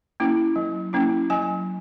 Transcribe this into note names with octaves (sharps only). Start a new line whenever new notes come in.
A#3 C#4 E4
F#3
A#3 C#4 E4
F#3 G#5